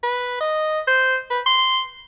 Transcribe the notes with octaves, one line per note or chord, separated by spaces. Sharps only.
B4
D#5
C5
B4
C6